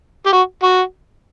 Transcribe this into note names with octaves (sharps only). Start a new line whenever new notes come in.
G4
F#4
F#4